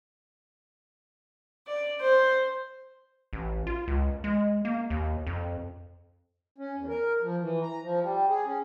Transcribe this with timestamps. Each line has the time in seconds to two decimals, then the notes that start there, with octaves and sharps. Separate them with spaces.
1.67 D5
2.00 C5
3.33 A1
3.67 F4
3.88 C#2
4.24 G#3
4.65 A#3
4.90 D#2
5.27 F2
6.58 C#4
6.75 E2
6.88 A#4
7.22 F3
7.40 E3
7.63 A#5
7.83 F3
8.03 G3
8.29 G#4
8.45 C#4